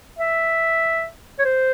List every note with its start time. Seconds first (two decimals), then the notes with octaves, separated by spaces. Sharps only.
0.19 E5
1.39 C#5
1.45 C5